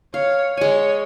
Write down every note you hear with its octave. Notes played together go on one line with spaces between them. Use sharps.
C#5 F5
G#3 C#5 G#5